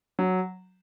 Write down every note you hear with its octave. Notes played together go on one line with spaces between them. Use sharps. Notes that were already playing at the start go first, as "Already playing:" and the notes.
F#3